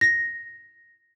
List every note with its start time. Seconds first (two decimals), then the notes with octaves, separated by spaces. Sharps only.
0.01 A#6